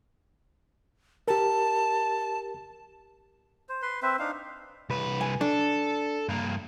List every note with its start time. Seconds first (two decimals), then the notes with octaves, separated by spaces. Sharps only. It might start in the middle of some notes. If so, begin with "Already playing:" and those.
1.28 G4 A#4 A5
3.69 C5
3.82 B4 C6
4.02 C4 B4 C5 E5
4.19 D4 D#4 F5
4.90 C2 B4
5.21 G#5
5.41 D4 A4
6.28 G2 A#3